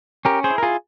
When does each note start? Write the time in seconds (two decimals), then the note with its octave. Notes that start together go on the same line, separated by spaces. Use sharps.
0.25 C#4 G4 A#4
0.44 G#4 C5
0.50 E4
0.58 A#4
0.63 F4 G#4